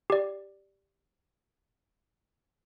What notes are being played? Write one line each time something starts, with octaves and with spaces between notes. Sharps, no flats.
G4 D5